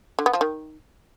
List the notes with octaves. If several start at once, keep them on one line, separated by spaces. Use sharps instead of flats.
D3
B3
F3
D#3